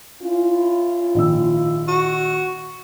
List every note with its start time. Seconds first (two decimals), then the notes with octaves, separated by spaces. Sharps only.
0.23 C#4 E4 F4
1.14 A#1 D#3 E6
1.88 F#4